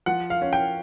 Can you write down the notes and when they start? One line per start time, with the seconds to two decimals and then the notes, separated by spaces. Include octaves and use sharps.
0.06 F3 F#5
0.30 F5
0.42 C#4
0.53 G5